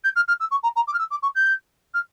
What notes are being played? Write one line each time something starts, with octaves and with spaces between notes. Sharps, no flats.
G6
F6
F6
E6
C#6
A#5
A#5
D6
F6
E6
D6
C#6
G6
F6